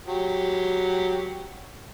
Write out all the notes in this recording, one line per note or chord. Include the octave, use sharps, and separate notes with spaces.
F#3 G4